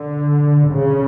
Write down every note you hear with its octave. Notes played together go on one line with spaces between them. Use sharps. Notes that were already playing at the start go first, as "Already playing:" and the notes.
Already playing: D3
C#3